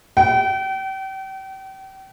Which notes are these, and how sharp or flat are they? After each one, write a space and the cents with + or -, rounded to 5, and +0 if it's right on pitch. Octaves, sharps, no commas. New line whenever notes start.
G5 -45